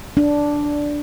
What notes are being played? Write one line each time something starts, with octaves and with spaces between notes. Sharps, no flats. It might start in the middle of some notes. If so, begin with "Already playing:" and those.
D4